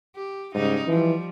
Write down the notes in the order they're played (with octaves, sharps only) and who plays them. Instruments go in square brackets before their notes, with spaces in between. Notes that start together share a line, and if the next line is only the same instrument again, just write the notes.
[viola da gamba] G4
[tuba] G#2 [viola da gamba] C#3 G3 D#4
[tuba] E3 [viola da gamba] F3 G3